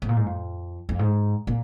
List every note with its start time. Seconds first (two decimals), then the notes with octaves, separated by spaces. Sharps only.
0.02 G#2
0.09 A#2
0.16 G#2
0.26 F2
0.89 F2
0.99 G#2
1.47 A#2